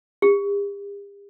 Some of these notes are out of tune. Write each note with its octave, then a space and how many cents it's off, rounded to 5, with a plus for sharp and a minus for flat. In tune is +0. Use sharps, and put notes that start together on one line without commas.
G4 +40